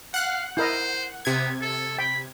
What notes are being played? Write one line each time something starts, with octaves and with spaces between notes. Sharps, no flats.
F5 F#5 F#6
E4 A#4 C5 D#5
C3 B3 G#6
A4
G5 B5